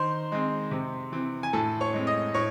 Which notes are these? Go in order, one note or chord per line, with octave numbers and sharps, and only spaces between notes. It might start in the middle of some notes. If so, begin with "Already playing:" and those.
Already playing: D#3 C5 C6
G#3 C4
C3
E3 C4
G#5
A2 A4 A5
C#5 C#6
G#3 C4
D#5 D#6
A2 C#5 C#6